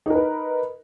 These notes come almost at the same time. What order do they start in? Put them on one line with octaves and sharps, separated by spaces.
D#4 A#4 B4